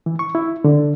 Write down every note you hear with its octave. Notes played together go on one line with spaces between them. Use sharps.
E3
C#6
E4
D3